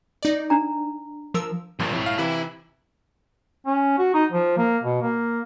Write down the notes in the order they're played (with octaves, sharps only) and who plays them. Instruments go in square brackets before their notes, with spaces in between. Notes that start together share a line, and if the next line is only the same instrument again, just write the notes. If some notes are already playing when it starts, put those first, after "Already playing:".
[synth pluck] D#4 D5
[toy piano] D4 A#5
[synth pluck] F3 A#4 E6
[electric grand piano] G#1 G2 A#2 [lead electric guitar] F3 D4
[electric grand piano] C2 C3 [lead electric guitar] E4 C#5
[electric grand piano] F5
[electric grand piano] C3 E3 [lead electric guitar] E4
[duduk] C#4
F#4
D#4
F3
A#3
B2
A#3